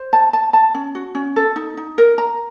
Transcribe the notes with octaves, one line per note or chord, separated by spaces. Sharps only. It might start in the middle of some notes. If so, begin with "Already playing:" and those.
Already playing: C5
A5
A5
A5
C#4
F#4
C#4
A4
D#4
D#4
A#4
A#5